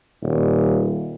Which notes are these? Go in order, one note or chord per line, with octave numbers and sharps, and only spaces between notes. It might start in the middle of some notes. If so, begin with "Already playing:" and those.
D#1